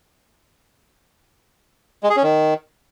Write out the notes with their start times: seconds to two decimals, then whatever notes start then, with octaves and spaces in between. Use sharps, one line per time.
2.03 G#3
2.10 G#4
2.17 C#4
2.23 D#3